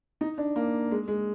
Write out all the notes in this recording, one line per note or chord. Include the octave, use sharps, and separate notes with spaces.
D#4
D4
A#3
G#3
G#3